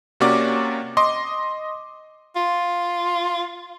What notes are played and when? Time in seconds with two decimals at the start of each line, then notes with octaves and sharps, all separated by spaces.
0.20 C3 A#3 C#4 F#4 D5 D6
0.97 D#5 C6 D6
2.36 F4